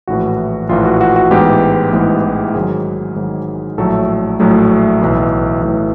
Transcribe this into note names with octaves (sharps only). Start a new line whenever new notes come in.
A#1 A2 E3 F#4
A#1 A2 E3 F4
F#4
F#4
F#4
A1 G#2 E3 G#3 B3 G4
A1 G#2 E3 G#3 B3
G#2 D#3 F#3 G#4
G#2 D#3 F#3
A#1 A2 F#3 A3 A4
A#1 A2 F#3 A3
B1 A2 E3
B1 A2 E3